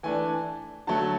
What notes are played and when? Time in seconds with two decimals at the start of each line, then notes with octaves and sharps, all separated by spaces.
0.03 E3 A3 D4 G#5
0.87 D3 F#3 A3 A5